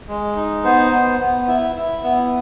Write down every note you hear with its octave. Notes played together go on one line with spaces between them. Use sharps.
G#3
D#4
B3 C5
B3
B3
E4
E4
B3